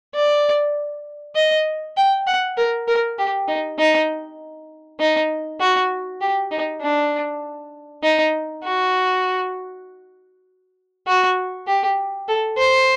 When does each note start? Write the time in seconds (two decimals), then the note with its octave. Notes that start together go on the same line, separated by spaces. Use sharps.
0.15 D5
1.36 D#5
1.97 G5
2.27 F#5
2.57 A#4
2.88 A#4
3.18 G4
3.48 D#4
3.79 D#4
5.00 D#4
5.60 F#4
6.21 G4
6.51 D#4
6.82 D4
8.03 D#4
8.64 F#4
11.07 F#4
11.67 G4
12.28 A4
12.58 C5